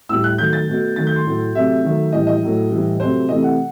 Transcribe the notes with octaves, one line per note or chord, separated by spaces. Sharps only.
A2 G3 E6
F#6
D#3 F#3 A3 G6
A6
B2 A3
D#3 F#3 A3 A6
G6
C6
A2 F#3 A3
C3 F#3 A3 E5
D#3 F#3 A3
A2 E3 G3 D#5
D#5
A2 F#3 A3
A2 E3 G3
C3 F#3 A3 C5
C3 E3 A3 D#5
F#5